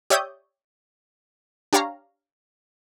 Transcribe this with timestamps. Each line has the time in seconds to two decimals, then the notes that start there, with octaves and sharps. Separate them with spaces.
0.10 G4 C#5 D5 E5 D#6 G6
1.73 D4 G4 C#5 F5 A#5